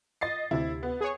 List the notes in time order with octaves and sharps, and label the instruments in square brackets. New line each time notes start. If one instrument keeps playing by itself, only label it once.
[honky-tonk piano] D#5 A6 C7
[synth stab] D2 C3 [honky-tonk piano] E4
[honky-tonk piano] B3
[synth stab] G#4 C#5